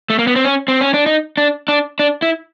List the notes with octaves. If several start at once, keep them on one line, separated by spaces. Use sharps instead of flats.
A3
A#3
B3
C4
C#4
C4
C#4
D4
D#4
D4
D4
D4
E4